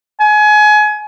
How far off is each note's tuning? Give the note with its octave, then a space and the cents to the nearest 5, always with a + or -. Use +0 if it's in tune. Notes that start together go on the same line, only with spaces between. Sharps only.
G#5 +30